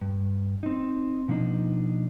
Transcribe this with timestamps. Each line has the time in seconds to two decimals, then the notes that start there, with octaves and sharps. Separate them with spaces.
0.02 G2
0.63 C4 D#4
1.28 B2 F3 A#3 D4 D#4